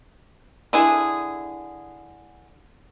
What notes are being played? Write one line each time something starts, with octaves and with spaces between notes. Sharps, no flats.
D3 E4 G#4